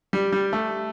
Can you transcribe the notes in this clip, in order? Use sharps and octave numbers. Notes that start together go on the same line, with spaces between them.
G3
G3
A3